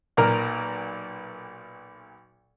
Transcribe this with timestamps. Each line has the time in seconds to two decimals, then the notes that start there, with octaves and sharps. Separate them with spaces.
0.17 B1 A#2 A#4 A#5 F6